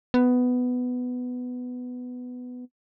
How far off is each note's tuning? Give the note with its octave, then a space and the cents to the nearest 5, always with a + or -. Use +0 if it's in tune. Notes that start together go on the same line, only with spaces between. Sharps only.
B3 +10